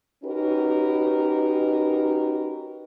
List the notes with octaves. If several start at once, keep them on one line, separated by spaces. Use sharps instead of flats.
C#4 D#4 F#4 G4 A#4 B4